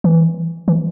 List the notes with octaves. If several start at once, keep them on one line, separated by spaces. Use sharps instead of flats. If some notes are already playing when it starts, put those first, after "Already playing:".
E3
E3